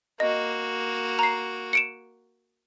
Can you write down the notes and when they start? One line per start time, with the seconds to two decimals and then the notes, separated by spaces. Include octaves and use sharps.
0.20 A#3 F#4 D#5
1.19 A#5 C7
1.73 C#7 D7 E7